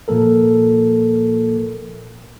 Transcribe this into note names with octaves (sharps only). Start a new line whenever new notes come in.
A#2 F3 A#3 A4 A#4